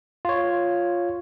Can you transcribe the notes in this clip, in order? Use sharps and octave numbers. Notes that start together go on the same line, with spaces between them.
F4 C#5